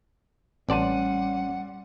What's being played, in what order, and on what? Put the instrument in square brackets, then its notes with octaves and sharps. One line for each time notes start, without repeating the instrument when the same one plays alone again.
[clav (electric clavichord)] A1 D5 A5 [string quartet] G3 [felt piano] C#4 C6 D#7 [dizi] F#5